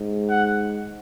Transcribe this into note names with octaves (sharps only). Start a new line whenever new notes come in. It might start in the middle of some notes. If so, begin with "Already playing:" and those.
Already playing: G#2
F#5